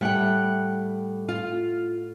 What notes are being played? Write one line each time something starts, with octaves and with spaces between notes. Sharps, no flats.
A2 G3 F#5 G5 F#6
F4